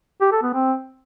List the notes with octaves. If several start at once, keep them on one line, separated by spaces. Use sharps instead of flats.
G4
A4
B3
C4